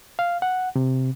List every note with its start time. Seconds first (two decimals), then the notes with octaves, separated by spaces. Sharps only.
0.19 F5
0.42 F#5
0.76 C3